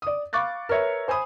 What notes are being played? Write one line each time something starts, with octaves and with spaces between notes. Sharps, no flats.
D5 D#6
F5 B5 C#6 D6 F#6 A6
A#4 B4 C#5 E5
C5 G#5 B5 D#6